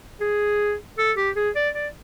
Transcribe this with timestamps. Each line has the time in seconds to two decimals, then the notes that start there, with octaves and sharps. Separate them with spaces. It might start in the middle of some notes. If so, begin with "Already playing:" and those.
0.21 G#4
0.98 A4
1.17 G4
1.36 G#4
1.56 D5
1.74 D5